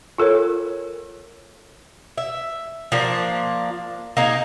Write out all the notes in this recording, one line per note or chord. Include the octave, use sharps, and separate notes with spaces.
F4 A4 A#4 C#5
E5
F3 A#3 D4
A#3 D#4 G#4